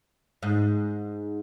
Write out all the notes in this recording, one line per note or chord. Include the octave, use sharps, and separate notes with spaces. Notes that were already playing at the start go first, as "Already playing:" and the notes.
G#2